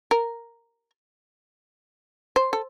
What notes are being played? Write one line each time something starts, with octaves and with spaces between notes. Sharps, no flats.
A#4
C5
A4